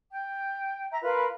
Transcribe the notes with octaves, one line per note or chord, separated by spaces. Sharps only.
G5
E5 A#5
F4 A#4 B4 B5